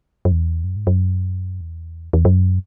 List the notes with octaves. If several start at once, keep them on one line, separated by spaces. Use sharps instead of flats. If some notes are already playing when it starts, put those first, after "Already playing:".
F#2
E2
F#2
G#2
F#2
E2
E2
F#2